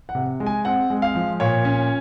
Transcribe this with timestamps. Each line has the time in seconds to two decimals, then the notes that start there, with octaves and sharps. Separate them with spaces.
0.09 F#5
0.15 C3
0.40 G#3
0.46 G#5
0.65 C4 F#5
0.90 G#3
1.02 F5
1.15 F3
1.40 A#2 C#5
1.65 C#4